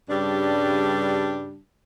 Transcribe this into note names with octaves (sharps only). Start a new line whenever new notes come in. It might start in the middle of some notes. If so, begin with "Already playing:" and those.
G2 C#3 G3 D4